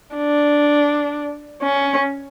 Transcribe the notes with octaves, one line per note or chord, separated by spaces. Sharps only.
D4
C#4